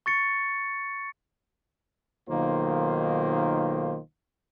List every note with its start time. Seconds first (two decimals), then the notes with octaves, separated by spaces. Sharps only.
0.06 C#6 A6 C#7
2.30 B1 D#3 A#3 F4 C5